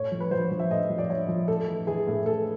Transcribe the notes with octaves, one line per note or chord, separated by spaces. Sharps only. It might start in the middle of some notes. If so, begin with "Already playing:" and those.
Already playing: A2 C#5
F3
B4
F3 C5
F3
E5
A2 D#5
F3
D5
F3 C#5
F3
A2 A4
E3
E3 G#4
A2
A2 A4